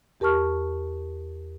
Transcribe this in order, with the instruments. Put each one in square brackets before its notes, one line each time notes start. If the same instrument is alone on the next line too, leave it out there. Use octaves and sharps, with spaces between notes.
[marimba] E2 G4 A#4 A5 C#6 F6